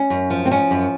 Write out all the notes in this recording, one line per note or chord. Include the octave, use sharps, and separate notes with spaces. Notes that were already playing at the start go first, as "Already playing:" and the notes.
Already playing: C#4
F#2
F3
C4
F3 C#4
F#2